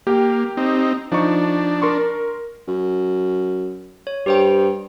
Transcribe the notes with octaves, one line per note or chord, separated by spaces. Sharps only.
A#3 G4 G5
C4 D#4
F3 D4 D#4 C#6
A#4 C6 C#6
F#2
C#5
G2 G4 C5 G5